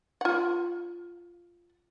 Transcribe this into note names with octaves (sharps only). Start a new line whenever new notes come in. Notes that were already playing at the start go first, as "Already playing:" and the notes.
F4 F#5